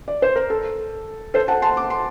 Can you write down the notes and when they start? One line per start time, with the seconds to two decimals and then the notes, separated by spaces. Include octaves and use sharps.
0.08 D5
0.22 C5
0.36 A#4
0.50 A4
1.34 A4 C5
1.48 F#5 A5
1.62 A5 C6
1.77 D6
1.90 C6